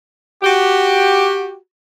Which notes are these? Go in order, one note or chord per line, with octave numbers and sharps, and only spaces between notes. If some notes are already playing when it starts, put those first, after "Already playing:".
F#4 G4